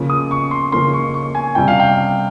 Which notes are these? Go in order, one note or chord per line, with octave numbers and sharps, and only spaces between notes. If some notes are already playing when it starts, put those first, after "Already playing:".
Already playing: C#3 F3 A#3 C#4
D#6
C#6
C6
C#3 F3 A#3 C#4 C6
C#6
C#6
G#5
C3 G3 C#4 F4 G5
F5
G5